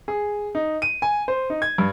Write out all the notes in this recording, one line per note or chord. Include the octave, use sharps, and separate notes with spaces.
G#4
D#4
D#7
G#5
C5
D#4
G#6
G2